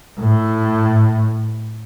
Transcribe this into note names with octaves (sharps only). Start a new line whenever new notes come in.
A2